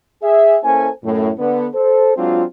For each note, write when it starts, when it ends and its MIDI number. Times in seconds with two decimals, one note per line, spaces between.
0.23 0.58 68
0.23 0.58 76
0.64 0.90 58
0.64 0.90 61
0.64 0.90 64
0.64 0.90 69
0.64 0.90 72
0.64 0.90 80
1.04 1.31 42
1.04 1.31 45
1.39 1.67 50
1.39 1.67 59
1.74 2.13 69
1.74 2.13 72
2.17 2.44 54
2.17 2.44 56
2.17 2.44 60
2.17 2.44 62
2.17 2.44 65